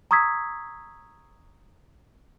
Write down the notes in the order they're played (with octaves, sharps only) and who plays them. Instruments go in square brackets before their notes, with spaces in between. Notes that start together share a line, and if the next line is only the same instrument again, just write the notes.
[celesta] A#5 C#6 D#6 E6 G#6 B6